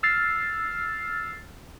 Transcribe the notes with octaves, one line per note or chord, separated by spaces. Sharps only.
E6 F6 A6 C7